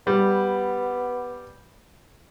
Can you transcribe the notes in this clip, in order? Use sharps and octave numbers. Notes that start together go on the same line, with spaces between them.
G3 B3